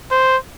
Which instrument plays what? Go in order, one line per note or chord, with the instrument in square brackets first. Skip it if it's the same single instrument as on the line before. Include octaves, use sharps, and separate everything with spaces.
[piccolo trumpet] C5